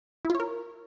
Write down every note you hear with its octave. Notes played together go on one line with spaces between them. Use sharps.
E4
F4
C#5
A#4